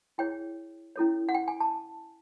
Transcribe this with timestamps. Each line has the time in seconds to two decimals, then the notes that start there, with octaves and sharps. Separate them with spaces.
0.18 E4 G#4 C#5 G5
0.96 C#4 E4 A4 C#5
1.29 F#5
1.34 G5
1.48 G#5
1.60 A5